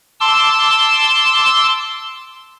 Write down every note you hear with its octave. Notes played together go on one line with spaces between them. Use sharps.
A5 C6 D6 E6